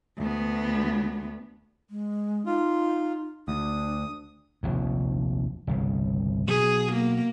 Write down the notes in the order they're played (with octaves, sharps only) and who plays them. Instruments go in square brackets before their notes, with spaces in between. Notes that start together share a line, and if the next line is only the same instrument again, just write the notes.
[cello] D2 B3
[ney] G#3
[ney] D#4 [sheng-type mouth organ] F4
[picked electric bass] D2 [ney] D4 [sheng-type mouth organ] D#6
[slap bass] F1 A#1 D#2
G1 C2 C#3
[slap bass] B2 F#3 [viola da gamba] G#4
[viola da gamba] A#3